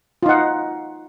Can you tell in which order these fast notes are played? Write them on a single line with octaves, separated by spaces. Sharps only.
F4 D#4 F#5